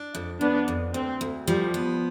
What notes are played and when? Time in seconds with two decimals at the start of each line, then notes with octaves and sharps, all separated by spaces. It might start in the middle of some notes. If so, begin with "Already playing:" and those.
Already playing: D4
0.15 F2
0.41 F2 B3 D4
0.68 F2
0.94 D2 C4
1.21 D2
1.47 F3 G3
1.74 B3